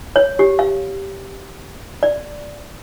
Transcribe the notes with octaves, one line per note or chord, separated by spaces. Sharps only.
C#5
G4
F5
D5